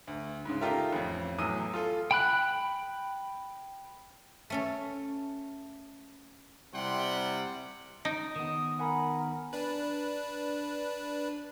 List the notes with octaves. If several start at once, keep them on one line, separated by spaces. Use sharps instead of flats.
D2
G#2 C#3
D#4 F4 G4 A4 A#4 E5
A1 F2
E2 A2 F#3 D#6 E6 D#7
F4 A4
G5 B5 F#6
A3 C#4 A4
C3 G3 E4 F#5 G5 C6
D#4 D7
D#3 B3 D#6
A#4 F#5 G#5 B5
D4 B4